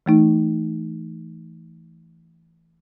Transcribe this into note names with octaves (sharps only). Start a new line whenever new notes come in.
E3 A3 D#4